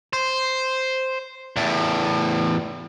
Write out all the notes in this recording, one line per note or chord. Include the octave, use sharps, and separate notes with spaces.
C5
E2 A2